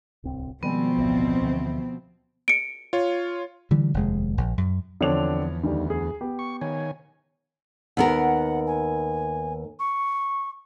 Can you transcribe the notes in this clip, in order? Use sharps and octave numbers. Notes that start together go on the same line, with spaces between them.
D1 C2 C4
B2 D#3 F3 G3 G#3 B3 C4
A1 D2
D2 D3 E3
C#7 D7
F4 C#5
D3 E3 G3
F1 D#2 G#3
A#1
F#2
E2 D3 F3 C4 D4 C#5 F7
D2 D#3 G3
G#4
B3 G4
C#6
D#3 C#5 G#5
D#2 B3 A#4 F#5
G#5
C#6